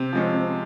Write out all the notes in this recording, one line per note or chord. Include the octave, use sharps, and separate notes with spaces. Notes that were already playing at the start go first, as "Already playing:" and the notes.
Already playing: C3 C4
F3 G#3 C#4